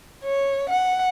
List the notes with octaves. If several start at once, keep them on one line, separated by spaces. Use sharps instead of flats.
C#5
F#5